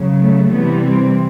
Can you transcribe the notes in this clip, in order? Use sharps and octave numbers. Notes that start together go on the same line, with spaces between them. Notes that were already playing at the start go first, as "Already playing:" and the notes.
Already playing: C#3 F#3
A3
C3 E3 G3 B3
C4